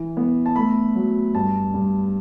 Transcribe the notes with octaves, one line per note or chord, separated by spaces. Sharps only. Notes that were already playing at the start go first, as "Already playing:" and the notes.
Already playing: E3
B3
A5
A3 B5
F#3
G2 A5
G2